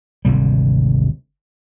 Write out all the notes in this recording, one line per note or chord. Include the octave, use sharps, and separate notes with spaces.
G#1 D2 C3 G3